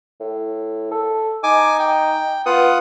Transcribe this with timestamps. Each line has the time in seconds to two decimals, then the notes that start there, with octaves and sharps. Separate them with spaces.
0.20 A2
0.91 A4
1.44 D#4 G#5 D6
1.79 G5
2.46 B3 F4 F#5 D#6